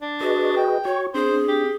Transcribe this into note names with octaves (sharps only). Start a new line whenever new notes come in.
D4
F#4 G#4 B4 D#5
G5
F#4 C#5 C#6
C4 D4 G#4 C5
G4